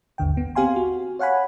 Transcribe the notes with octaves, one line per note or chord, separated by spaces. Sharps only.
G#1 D#2 D3 G5
B3
C4 G4 F5 G#5 C6
F#4
C#5 F5 F#5 G#5 B5